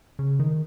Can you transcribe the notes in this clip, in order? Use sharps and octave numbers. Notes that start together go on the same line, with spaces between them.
C#3
D#3